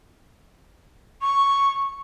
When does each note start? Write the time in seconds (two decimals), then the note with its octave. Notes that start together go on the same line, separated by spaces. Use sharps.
1.21 C#6